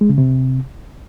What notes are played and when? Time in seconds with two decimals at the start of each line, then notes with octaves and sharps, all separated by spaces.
0.01 G#3
0.09 C#3
0.18 C3